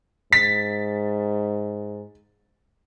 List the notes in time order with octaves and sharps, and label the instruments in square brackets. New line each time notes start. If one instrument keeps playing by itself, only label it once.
[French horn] G#2 [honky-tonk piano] A6 B6